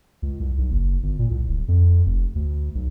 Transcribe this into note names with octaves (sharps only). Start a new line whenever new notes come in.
C#2
C2
B1
F#1
G1
A#2
C2
D1
F2
F1
D2
B1